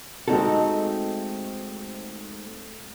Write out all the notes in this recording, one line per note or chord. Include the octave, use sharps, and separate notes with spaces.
G#3 A3 C4 D#4 F#4 A4